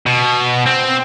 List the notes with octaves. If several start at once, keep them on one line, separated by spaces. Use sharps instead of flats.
B2
C4